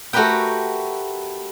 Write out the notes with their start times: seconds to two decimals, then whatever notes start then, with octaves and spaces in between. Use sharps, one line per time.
0.13 A3 F#4 G4 A#4 B4 G5